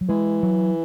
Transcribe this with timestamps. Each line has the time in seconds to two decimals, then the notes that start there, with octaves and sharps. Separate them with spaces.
0.01 F#3
0.09 E3 G#3
0.43 F#3